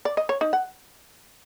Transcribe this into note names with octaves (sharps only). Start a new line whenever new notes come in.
D5
D#5
C#5
D#4
F#5